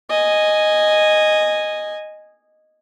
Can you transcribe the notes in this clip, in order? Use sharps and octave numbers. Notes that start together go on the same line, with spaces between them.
D#5 G#5